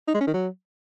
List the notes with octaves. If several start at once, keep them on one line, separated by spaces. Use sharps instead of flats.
D#4
G#3
C#4
D#3
F#3